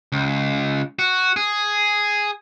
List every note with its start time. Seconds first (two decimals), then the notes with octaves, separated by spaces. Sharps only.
0.12 C#2
0.99 F#4
1.36 G#4